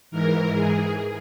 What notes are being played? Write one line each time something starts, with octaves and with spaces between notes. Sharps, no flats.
G#2 E3 A#4
G#4